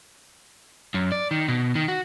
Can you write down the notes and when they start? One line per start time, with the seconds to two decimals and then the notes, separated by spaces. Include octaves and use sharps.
0.94 F#2
1.12 D5
1.31 D#3
1.48 B2
1.75 D#3
1.88 F#4